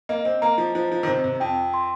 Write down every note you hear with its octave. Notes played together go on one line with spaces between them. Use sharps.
A#3 D#5
C4
A#3 A#5
F3
F3 C5
F3
D#3
C3 C5
C3
F2 G5
C6